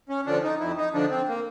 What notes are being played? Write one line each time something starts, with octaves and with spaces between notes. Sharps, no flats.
C#4
D3 F3 D4
D#4
F2 E4
D#4
D3 F3 D4
C4
A#3